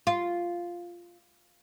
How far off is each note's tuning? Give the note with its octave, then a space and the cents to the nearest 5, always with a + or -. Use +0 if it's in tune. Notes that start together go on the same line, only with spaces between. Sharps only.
F4 -5